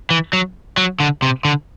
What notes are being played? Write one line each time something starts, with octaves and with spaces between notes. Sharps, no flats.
E3
F#3
F#3
D3
C3
D3